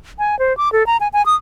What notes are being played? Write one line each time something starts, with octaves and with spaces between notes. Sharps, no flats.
G#5
C5
D6
A4
A#5
G#5
G#5
D#6